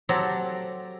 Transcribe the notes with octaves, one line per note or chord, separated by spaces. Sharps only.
F#3 C4 G4 A4 A#5